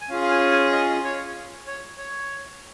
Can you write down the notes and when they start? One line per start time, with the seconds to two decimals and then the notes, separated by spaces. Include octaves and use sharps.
0.01 G#5
0.09 C#4 F4 G#4 F5
0.22 F5
0.31 G#5
0.51 G#5
0.72 D#5
1.04 C#5
1.67 C#5
1.98 C#5